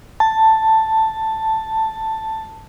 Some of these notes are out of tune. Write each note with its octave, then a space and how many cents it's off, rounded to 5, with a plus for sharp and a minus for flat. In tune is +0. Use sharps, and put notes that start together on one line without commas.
A5 +5